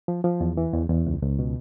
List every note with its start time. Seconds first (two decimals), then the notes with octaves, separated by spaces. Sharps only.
0.08 F3
0.24 F3
0.41 E2
0.57 E3
0.73 E2
0.90 E2
1.07 C#2
1.22 C#2
1.39 B2